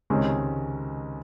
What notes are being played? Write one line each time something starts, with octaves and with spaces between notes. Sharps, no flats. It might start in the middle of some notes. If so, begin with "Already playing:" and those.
C#2 C3 D#3 G#3 C#4